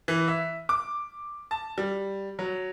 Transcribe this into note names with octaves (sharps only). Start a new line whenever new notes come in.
E3
E5
D6
A5
G3
F#3